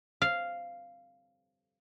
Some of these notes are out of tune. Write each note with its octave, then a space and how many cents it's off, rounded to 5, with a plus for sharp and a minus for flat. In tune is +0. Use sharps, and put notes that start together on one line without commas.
F5 -5